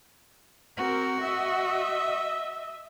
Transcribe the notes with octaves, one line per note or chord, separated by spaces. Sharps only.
C4 F#4 A#4
D#5 E5